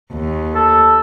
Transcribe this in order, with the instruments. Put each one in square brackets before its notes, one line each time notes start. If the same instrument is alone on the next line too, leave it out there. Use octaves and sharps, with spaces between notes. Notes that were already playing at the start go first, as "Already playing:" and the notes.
[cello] D#2
[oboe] A4